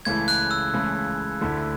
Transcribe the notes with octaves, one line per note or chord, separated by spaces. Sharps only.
C#2 C#3 E3 A3 E4 G#6
F#6
E6
C#2 C#3 E3 A3 E4
D2 D3 A3 E4